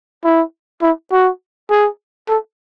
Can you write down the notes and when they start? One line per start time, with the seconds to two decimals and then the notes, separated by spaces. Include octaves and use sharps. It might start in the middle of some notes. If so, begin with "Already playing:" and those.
0.24 E4
0.82 E4
1.12 F#4
1.70 G#4
2.28 A4